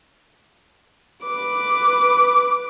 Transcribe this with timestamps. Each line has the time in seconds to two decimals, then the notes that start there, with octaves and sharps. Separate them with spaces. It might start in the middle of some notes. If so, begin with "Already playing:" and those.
1.24 B4 D6